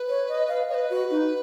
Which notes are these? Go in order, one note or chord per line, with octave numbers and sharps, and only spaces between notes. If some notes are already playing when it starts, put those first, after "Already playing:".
Already playing: B4
C#5
D#5
F5
B4 C#5 D#5
F#4
D#4